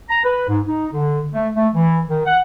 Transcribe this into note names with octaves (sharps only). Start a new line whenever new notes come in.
A#5
B4
G#2
D#4
D3
A3
A3
E3
D#3
F#5